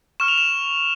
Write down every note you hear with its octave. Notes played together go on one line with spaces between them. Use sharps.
C#6 F6 E7
F7
E7